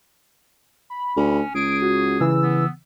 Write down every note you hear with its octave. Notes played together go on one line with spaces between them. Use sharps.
B5
D2 C#4
C#2 G#4 D7
F#4
C#3 E3 E6
B3